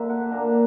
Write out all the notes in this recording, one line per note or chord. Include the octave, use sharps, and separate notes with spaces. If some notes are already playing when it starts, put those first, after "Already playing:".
Already playing: D3 A#3 D4 E5
F#5
A#2 A#3 D4 A#5